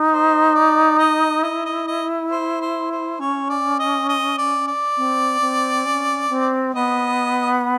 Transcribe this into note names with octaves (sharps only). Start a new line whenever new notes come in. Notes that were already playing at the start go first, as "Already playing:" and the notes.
Already playing: D#4
C5
D5
D#5
E4 D#5
D#5
D#5
C5
C5
C5
C#4 C#5
D5
D#5
D#5
D5
D5
C4
C4
C#4
C4
B3 D#5